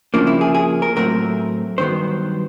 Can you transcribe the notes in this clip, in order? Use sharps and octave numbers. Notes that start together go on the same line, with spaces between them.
F2 C#3 F3 A#3 D4
E4
G#4
G#4
A#4
A2 F#3 A3 C4 A#4
G2 D#3 F#3 B3 C5